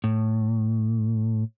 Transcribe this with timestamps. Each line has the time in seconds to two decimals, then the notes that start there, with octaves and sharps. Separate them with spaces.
0.04 A2